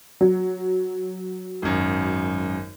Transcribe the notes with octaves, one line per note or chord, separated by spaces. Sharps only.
F#3
G#1 F#2